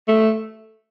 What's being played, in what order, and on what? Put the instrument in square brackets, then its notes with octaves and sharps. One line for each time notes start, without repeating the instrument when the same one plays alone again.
[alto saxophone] A3